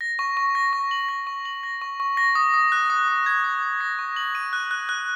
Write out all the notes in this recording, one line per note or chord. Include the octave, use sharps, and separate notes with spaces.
A#6
C#6
C#6
A#6
C#6
F#7
A#6
C#6
F#7
A#6
C#6
C#6
A#6
D#6
D#6
F#6
D#6
D#6
G#6
D#6
D#6
A#6
C#6
F#7
D#7
F#6
F#6
F#6